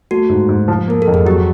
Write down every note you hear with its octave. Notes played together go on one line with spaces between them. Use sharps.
A3 F#4
G#2
G#2
F3
A#3 A#4
A4
F2
G#4
F#3 G4